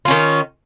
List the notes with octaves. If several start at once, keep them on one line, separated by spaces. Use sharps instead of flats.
D#3 C#4 F4